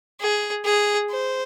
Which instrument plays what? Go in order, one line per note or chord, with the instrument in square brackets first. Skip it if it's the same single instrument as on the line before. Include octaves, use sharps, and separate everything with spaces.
[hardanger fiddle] G#4
G#4
C5